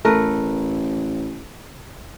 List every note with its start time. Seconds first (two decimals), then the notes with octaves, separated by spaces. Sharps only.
0.05 A1 A3 A#4 B4